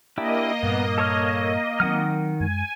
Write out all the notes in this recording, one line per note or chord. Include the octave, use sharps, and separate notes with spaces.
A#3 D4 E4 G4 D#5
G2 A#2 B3
A4 C#5 F6
D#3 F#3 C4 F#5 F6
F#2 G#3 G#5